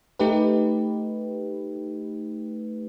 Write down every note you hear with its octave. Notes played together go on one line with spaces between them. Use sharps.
A3 D#4 G4 B4